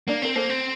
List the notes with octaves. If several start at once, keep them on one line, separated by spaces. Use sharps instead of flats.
A#3 D4
C4 A#4
A#3 A4 C5
C4